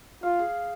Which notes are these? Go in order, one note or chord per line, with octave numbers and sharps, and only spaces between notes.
F4 F5
G#4